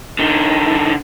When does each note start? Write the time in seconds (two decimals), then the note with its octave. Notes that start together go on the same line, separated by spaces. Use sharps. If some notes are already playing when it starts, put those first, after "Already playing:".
0.19 D3 D#4